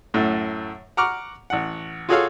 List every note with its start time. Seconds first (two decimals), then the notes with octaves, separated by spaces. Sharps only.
0.14 F#2 A2 A3
0.97 F#5 A#5 C#6 D6 F6
1.50 A1 F#5
2.09 F4 F#4 G#4 A4 C#5 F5